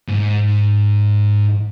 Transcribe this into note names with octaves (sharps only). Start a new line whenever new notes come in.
G#2